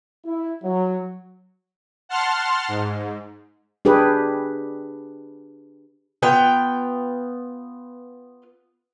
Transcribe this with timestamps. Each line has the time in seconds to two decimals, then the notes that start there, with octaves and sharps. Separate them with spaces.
0.25 E4
0.63 F#3
2.09 F#5 A5 C6 F6
2.68 G#2
3.85 D4 G4 G#4 B4
6.22 B3 F4 G5